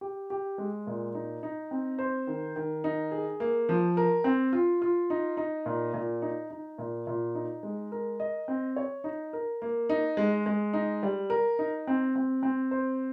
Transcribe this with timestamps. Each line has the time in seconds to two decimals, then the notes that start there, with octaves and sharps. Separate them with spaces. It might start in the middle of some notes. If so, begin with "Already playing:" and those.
0.01 G4
0.30 G4
0.58 G#3
0.87 A#2
1.15 D#4
1.43 D#4
1.71 C4
1.99 C5
2.27 D#3
2.56 D#3
2.84 D#4
3.12 G#4
3.40 A#3
3.69 F3
3.97 A#4
4.24 C4
4.53 F4
4.82 F4
5.10 D#4
5.37 D#4
5.66 A#2
5.94 A#2
6.22 D#4
6.50 D#4
6.78 A#2
7.07 A#2
7.35 D#4
7.63 G#3
7.92 A#4
8.20 D#5
8.48 C4
8.76 C#5
9.04 D#4
9.33 A#4
9.62 A#3
9.89 D#4
10.17 G#3
10.46 G#3
10.73 D#4
11.03 G3
11.30 A#4
11.59 D#4
11.87 C4
12.16 C4
12.43 C4
12.71 C5